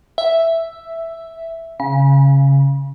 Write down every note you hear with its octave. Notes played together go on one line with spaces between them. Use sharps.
E5
C#3